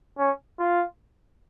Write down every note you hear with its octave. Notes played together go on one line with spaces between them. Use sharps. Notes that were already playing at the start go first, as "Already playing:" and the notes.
C#4
F4